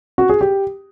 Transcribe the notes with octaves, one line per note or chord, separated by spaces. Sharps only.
F#4
G#4
G4